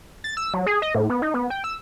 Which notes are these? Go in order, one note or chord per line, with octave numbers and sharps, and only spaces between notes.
A6
E6
F#3
G#4
D#5
A2
B3
D#4
B3
G5
E6